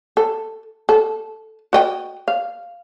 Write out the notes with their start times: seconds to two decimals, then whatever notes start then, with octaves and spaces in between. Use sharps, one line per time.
0.17 A4
0.89 A4
1.73 F#4 D#5 G5
2.28 F5